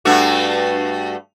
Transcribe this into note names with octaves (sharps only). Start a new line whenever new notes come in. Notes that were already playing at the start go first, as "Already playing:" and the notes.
G2 A3 F#4